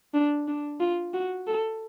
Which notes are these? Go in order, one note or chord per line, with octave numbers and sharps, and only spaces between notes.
D4
D4
F4
F#4
A4